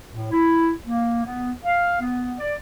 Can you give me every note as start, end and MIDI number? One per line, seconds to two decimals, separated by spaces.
0.14 0.30 45
0.31 0.71 64
0.85 1.22 58
1.25 1.51 59
1.64 1.98 77
2.01 2.34 59
2.39 2.53 74